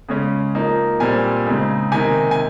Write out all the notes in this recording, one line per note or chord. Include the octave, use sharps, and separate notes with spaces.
C#3 G#3 C#4
F3 A#3 D#4
A#2 G3 C4 G#5
C#3 G#3 C4 D#4
C3 D#3 A#3 D#4 G#5
G#5